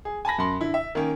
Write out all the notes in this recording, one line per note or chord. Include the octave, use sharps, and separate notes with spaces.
G#4
G#5 A5 B5 A#6
F#2 A5 B5 C6
D3 E4
E5
D#3 A#3 C#4